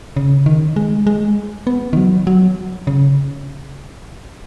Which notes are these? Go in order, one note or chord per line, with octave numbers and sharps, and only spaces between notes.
C#3
D#3
G#3
G#3
B3
D#3
F#3
F#3
C#3